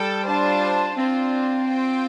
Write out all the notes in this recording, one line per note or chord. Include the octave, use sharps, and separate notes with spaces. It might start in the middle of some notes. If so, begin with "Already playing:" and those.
Already playing: G3 A4 G5
D4 F4 C5 A5
C4 D4 F4 C5
F4 C5 G5